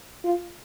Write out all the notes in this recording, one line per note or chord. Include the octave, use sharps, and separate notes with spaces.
F4